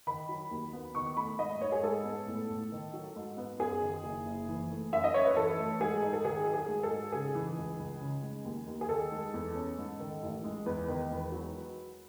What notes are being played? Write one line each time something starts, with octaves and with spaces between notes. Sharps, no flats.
D#3 B5
F#3
D#2
B3
D#3 C#6
A3 B5
G#2 D#5
G#2 C#5
G#4
G#3 A4
B3
A2
A2
D#3
F#3
G#2
B3
F#2 G#4
D#3
F#1
F#1
E3
A3
F#2 E5
D#5
F#2 C#5
B4
E3 A4
A3
G#2 G#4
D#4
A4
D#3 G#4
F#3
G#4
G#2
A4
G#2
C#3 G#4
E3
C#2
C#2
C#3
G#3
D#2
D#2
G#4
D#3 A4
G#3
E2
C#4
G#2
D#3
A1
G#3
E2 B4
D#3
E1
F#3